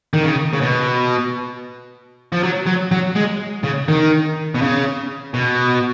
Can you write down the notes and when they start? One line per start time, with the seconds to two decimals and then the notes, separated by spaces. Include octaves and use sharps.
0.14 D#3
0.24 C#3
0.53 C#3
0.61 B2
2.32 F3
2.43 F#3
2.66 F#3
2.92 F#3
3.16 G#3
3.64 C#3
3.88 D#3
4.55 B2
4.61 C#3
5.34 B2